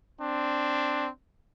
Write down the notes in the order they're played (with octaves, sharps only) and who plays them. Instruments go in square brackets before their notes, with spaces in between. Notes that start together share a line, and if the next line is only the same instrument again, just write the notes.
[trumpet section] C4 D4